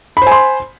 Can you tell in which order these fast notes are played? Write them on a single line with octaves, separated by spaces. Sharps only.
B5 C5 G#5 C6